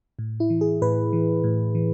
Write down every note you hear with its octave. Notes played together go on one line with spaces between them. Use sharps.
A2
E4
E3
G#4
A2 B4
E3
A2
E3